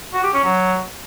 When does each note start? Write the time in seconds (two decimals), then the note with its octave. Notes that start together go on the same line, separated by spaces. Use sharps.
0.13 F#4
0.24 G4
0.34 C#4
0.44 F#3